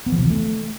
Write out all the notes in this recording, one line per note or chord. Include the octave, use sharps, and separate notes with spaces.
B3
F3
C3
E3
A3